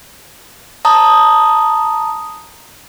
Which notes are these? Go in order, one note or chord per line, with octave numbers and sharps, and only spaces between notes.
A5 A#5 D#6